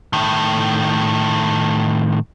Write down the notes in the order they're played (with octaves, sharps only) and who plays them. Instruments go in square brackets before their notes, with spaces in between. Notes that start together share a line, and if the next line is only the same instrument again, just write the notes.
[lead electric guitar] A2 D#3